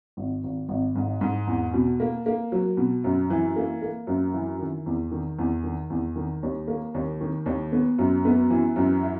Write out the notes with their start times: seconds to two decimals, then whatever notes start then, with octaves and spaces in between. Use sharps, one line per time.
0.17 G#1
0.44 G#1
0.69 G#1
0.95 G#2
1.21 G#2
1.47 E2
1.74 B2
2.00 A#3
2.26 A#3
2.52 F#3
2.77 B2
3.04 F#2
3.30 E3
3.56 A#3
3.82 A#3
4.07 F#2
4.34 E3
4.59 D#3
4.86 E2
5.11 D#3
5.39 E2
5.63 D#3
5.90 E2
6.16 D#3
6.43 D#2
6.68 A#3
6.94 D#2
7.21 D#3
7.46 D#2
7.72 B3
7.99 F#2
8.25 B3
8.50 E3
8.76 F#2
9.03 E4